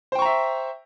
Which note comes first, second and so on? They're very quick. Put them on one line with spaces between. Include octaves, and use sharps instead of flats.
C5 G5 C#6 A#5 E5